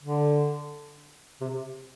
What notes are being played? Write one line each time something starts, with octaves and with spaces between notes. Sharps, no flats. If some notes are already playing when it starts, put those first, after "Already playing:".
D3
C3